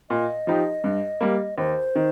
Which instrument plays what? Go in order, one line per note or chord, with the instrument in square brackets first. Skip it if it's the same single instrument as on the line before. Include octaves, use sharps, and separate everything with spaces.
[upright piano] A#2 [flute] D#5
[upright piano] F3 D#4 G4
G2
G3 A#3
[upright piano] D#2 [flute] C5
[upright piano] D#3